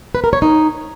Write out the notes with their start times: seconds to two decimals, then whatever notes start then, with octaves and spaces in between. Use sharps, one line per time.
0.15 B4
0.24 A#4
0.33 C#5
0.42 D#4